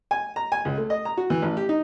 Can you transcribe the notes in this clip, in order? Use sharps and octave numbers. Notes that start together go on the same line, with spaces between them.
G#5
A#5
G#5
C#2
A3
D#5
A#5
F#4
E3
A1
G4
D#4